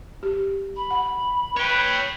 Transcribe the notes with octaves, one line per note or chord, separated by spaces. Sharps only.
G4
B5
F#5
B4 C#5 G5